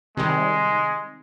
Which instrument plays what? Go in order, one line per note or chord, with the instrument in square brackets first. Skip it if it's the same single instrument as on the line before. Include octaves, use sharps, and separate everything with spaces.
[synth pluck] C3 D#3 G3 [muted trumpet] G#3